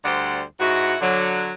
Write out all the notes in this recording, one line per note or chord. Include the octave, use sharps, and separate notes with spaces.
D2 G3 C5 D5 F#5
G#2 E4 F#4
D3 F#3